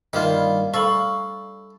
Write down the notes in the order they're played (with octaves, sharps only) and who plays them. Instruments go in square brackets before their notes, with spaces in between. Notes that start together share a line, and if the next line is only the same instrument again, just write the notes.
[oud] G2 [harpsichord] D#3 A#3 F4
[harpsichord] A4 [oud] F5 [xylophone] B5 C#6